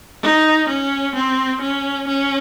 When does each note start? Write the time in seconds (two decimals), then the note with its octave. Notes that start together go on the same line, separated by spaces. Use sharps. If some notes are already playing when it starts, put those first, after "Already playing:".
0.23 D#4
0.69 C#4
1.15 C4
1.61 C#4
2.08 C#4